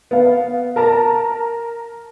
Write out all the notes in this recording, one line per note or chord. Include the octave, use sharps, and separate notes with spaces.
B3 F5
A#4 A5 A#5